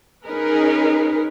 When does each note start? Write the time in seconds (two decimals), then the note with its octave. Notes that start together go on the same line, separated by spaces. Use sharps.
0.25 C#4 D#4 G#4 A#4 B4